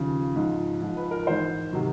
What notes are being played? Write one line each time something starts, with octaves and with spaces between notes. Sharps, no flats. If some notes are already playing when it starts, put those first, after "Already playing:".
Already playing: D#2 C#3 F3
G#2 F3
G#2 F3
B4
A#4
G#2 E3 C5
C3 D#3 F#3